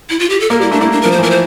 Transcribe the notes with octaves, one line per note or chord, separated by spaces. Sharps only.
E4
F4
G4
A4
A#3 A#4
G3 E4
A3 D4
A#3 E4
D4
F3 A#4
C5
E3 A#4
C5